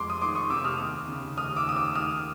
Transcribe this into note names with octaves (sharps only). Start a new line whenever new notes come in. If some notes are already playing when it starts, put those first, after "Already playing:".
Already playing: F2 G#3 C6 D6
D#6
D#3 C6 D6
C#6 D#6
C3 D6 E6
D#6 F6
D#2
C#3
D#2 D#6 F6
D6 E6
D#2 D#6
D6 E6
D#3 D#6 F6